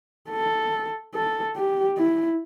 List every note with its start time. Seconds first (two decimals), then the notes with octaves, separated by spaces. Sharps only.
0.30 A4
1.14 A4
1.56 G4
1.97 E4